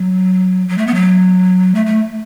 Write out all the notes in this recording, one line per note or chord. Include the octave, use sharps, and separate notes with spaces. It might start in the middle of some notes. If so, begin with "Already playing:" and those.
Already playing: F#3
F#3
A3
B3
F#3
A3
A3